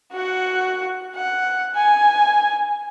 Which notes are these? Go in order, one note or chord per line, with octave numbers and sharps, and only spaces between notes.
F#4 F#5
F#5
G#5